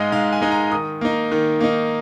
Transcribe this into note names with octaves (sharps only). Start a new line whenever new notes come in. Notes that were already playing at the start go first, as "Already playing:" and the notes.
Already playing: G#2 G#3 D#4 D#5 F5
G#2 F5
G#5
G#3 D#4
A#5
D#3 D#6
A#3 D#4
D#3
A#3 D#4